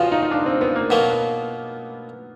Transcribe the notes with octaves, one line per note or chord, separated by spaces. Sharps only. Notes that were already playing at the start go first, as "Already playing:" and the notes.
Already playing: E2 C#3 F3 F4 F#4
D#4
D#4
D4
C4
B3
A#3
B2 F#3 A#3
B3